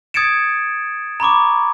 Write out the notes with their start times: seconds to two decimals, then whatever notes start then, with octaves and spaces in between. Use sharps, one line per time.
0.14 D#6 G#6 A6 C#7 D7 E7
1.20 A#5 B5 C#6 D6